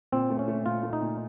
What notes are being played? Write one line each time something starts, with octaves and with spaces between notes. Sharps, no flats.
A#2 C4
A3
C#4
A3
A#2 F4
A3
D#4
A#2